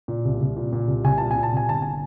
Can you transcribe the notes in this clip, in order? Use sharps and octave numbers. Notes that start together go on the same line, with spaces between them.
A#2
C2
C2
A#2
A#2
C2
C2 G#5
A#2 A5
A#2 G#5
A5
C2 G#5
G1 A5
G#5